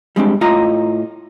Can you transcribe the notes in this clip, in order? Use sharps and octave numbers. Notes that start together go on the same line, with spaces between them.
G3 G#3 C4 D4
A2 F4 D#5 A#5